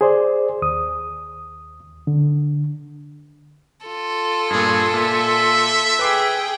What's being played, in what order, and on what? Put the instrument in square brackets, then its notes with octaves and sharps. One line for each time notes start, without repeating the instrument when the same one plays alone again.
[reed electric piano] G#4 C5 D5
D#2 D#6
D3
[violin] F4 A4
[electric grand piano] G2 A#2 [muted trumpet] G#4
[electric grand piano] A#2 [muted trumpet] E5
[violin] G#4 G5 [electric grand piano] B4 D6 C7